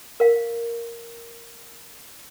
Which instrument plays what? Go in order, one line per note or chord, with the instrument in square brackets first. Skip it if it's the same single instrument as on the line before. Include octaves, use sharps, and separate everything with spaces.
[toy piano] A#4 F5